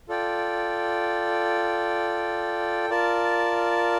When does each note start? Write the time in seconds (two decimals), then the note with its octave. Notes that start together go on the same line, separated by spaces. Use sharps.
0.09 F4 A4 D5 G5
2.90 F4 A#4 D5 A5